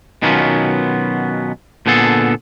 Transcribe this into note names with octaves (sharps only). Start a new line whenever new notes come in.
B2 D#3 F#3 B3 C#4 F4
A#2 D3 B3 G#4 A4